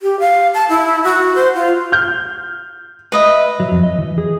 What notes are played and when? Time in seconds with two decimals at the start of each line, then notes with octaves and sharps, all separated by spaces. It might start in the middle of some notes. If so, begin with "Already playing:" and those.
0.02 G4
0.20 F5
0.54 A5
0.69 E4
1.04 F#4
1.35 C5
1.55 F4
1.92 F6 G6
3.12 B4 D#5 E5
3.60 F#3
3.72 F2
3.83 D#5
3.99 E3
4.18 G#4